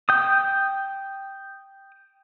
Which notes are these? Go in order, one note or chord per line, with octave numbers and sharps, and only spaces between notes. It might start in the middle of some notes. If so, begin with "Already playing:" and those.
G5 D#6